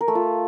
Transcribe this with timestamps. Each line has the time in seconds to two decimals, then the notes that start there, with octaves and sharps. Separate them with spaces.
0.01 A#4
0.08 A3
0.15 F4